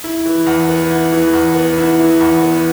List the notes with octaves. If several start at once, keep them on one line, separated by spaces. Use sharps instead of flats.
E4
E3
E2
B3
E4
E3
E2
B3
E4
E3
E2
B3